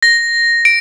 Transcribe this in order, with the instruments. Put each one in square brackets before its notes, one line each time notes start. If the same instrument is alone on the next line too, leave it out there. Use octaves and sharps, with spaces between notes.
[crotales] A#6
D7